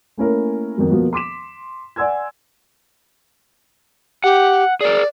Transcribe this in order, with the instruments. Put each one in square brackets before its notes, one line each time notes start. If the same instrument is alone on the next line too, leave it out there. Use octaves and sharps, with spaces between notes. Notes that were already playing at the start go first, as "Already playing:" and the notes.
[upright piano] A3 A#3 C#4 E4 A#4
F2 D#3 F#3
B2 F3 A#3 B3 F#4
C6 D6 B6 E7
D5 F#5 G#5 C6 E6 G#6
[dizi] G4 [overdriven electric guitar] F#5
[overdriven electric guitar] G#4 A#4 [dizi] D5